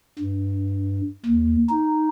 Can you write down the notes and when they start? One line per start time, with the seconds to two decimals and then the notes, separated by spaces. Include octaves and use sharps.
0.19 G2
1.26 D#2
1.70 D#4